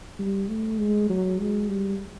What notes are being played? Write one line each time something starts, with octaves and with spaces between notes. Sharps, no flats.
G3
A3
G#3
F#3
G#3
G3